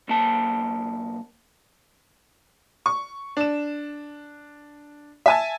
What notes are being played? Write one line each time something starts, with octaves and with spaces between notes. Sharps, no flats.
B1 A#3 A5
C#6
D4 E7
E5 G#5 A5